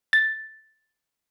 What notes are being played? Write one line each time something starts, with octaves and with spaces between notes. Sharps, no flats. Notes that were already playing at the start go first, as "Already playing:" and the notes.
A6